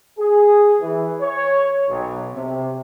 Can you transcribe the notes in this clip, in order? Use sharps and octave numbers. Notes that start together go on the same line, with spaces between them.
G#4
E3
C#5
B1
C3